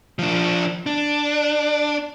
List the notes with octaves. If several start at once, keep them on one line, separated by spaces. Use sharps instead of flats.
F3 D4
D4